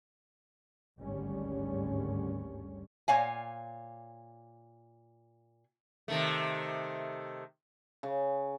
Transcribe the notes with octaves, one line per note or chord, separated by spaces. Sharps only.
G#1 D2 G2 D3 G3 C#4
A#2 C#5 F5 G#5
C3 D#3 A3
C#3